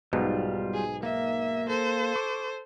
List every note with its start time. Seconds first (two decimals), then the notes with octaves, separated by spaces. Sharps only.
0.13 B1 G#2 B2 G3 F4
0.73 G#4
1.03 A#3 E5
1.67 A4 C5
2.15 C#6 D6